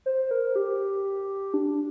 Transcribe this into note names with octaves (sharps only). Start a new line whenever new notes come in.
C5
A#4
G4
D4